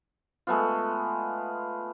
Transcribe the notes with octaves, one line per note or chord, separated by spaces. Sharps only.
G#3 A3 B3 F4